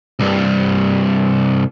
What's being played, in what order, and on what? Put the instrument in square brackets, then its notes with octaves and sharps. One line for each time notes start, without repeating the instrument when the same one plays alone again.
[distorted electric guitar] C2 G2